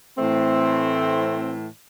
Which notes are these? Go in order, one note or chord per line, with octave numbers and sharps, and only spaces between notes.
A2 E3 A3 C4